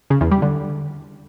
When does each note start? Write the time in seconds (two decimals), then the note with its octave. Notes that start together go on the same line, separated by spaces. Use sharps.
0.10 C#3
0.21 E2
0.31 G3
0.42 D3